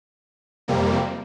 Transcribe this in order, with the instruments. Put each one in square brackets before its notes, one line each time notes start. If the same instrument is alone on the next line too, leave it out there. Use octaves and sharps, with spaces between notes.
[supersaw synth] F2 C3 G3 A#3